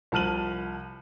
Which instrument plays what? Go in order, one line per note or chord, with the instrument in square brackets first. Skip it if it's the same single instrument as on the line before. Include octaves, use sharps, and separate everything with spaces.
[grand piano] C2 F3 A5 F6 D#7 F#7